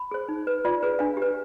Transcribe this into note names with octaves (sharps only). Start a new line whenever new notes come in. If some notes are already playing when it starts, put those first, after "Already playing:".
Already playing: B5
G#4 C5
D#4
B4
F4 D5
G#4 B4
D4 F5
G4
B4